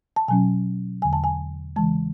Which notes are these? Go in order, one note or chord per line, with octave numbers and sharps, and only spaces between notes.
A5
B2 F#3 C#4 G#5
E2 D3 G#3 G#5
A5
G#5
C#3 E3 G#3 A5